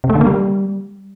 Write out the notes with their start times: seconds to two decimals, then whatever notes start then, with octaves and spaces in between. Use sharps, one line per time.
0.04 C3
0.10 A3
0.15 D3
0.21 A#3
0.27 G3